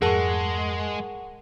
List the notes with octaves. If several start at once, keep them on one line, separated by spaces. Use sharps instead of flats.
F2 G#2 G#3 G#4 A#4 F#5 A5 C#6